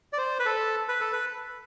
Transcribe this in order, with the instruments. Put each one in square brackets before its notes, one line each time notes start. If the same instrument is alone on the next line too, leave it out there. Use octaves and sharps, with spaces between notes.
[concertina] D5
C5
B4
A4
B4
A4
B4